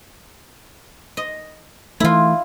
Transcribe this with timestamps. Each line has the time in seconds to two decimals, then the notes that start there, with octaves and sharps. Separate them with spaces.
1.17 D#5
2.00 E3 A3 E4 F4